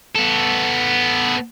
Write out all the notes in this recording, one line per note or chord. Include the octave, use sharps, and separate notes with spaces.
B3 A4